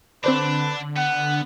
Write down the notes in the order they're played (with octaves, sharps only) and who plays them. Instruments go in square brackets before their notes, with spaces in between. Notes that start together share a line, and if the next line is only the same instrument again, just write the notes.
[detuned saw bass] D3 [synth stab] C4 C5 D5 [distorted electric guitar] D4 [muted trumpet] B4
[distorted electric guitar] B3 [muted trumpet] F#5